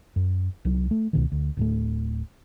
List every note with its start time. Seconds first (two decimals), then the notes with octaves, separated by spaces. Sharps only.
0.16 F#2
0.65 C2 F#3
0.91 A3
1.13 C#2 B2 D#3
1.32 D2
1.57 D1 A2 A3